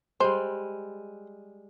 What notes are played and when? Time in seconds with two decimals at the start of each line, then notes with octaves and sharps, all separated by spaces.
0.20 G3 G#3 C5